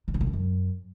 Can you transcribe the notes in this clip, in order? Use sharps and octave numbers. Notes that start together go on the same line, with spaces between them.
B2
D3
A#2
G2
F#2